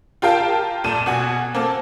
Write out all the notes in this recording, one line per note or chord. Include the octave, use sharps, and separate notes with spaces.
F4 G4 A#4 F5 G5 A5
G#1 A#2 A4 D#7 E7
B2 F#4 G#5
A#3 C4 A4